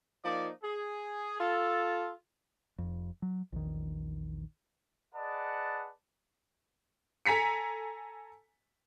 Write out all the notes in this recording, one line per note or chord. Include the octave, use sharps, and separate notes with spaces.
F3 A#3 D#4 D5
G#4
F4 A4
F1 F2
F#3
A#1 E2 D#3
G#4 B4 D5 D#5 F#5 A5
A4 G#5 A#5 B6 C#7